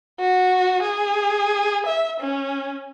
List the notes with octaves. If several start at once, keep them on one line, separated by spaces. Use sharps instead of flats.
F#4
G#4
E5
C#4